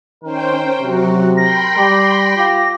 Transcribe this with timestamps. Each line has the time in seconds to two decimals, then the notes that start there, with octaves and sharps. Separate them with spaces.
0.23 D#3 C#4 A#4 C5 G5
0.80 C3 F#3 F#4
1.37 A#4 G5 B5 C6 A#6
1.77 G3 G4
2.37 F4 G4